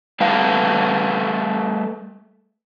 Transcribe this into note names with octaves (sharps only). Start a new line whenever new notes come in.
G3 A3 A4 B4 F5